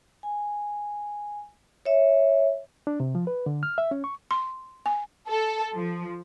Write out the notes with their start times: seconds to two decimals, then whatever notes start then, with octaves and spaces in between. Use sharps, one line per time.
0.23 G#5
1.86 C#5 E5
2.87 D4
3.00 C3
3.15 F3
3.27 B4
3.46 D3
3.63 F6
3.78 E5
3.91 C#4
4.04 C#6
4.31 C6
4.86 G#5
5.29 A4
5.77 F3